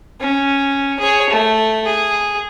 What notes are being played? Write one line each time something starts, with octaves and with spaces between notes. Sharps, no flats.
C#4
G#4 C#5
A3
G#4